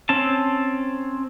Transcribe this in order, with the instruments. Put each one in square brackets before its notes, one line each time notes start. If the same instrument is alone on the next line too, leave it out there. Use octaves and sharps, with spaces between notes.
[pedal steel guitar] C4 C#4 A5